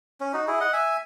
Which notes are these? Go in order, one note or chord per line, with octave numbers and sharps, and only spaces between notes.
C#4
D#4 F#4
E4 G#4
D#5 F#5
E5 G#5